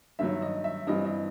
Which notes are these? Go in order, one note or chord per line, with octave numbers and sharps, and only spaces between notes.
G2 D#3 F#3 E5
D#5
E5
G2 E3 G3 C4 D#5
D#5